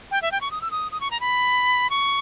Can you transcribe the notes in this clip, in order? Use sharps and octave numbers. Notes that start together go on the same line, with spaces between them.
G5
E5
G5
C#6
D#6
E6
D#6
D#6
C#6
A#5
B5
C#6